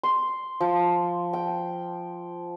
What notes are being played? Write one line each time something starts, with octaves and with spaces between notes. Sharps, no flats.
C6
F3
G5